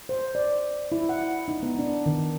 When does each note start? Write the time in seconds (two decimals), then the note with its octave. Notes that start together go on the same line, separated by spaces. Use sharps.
0.09 C5
0.35 D5
0.92 E4
1.09 F#5
1.48 D#4
1.63 B3
1.79 D4
2.06 D#3